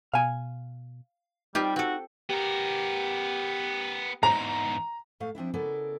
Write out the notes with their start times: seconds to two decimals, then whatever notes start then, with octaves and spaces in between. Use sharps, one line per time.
0.14 B2 F5 G#5
1.55 G3 C4 D#4 F4 G4
1.76 C4 F#4 A4
2.30 B3 G4 A#4
4.23 E2 G#2 A#5
5.20 A2 A3 F5
5.35 F3 C4 D4 E4
5.54 C#3 B3 E4 A4 A#4 D5